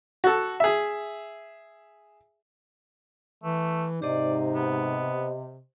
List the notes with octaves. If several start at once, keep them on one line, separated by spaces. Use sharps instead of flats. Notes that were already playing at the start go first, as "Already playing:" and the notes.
F#4 A4
G#4 E5
E3 A3
G#2 C3 D#4 G4 C5 D5 D#5
B3